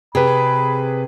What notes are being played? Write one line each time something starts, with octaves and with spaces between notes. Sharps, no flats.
C3 G#4 B4 B5